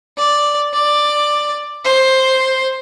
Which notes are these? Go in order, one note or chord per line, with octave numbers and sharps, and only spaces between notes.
D5
D5
C5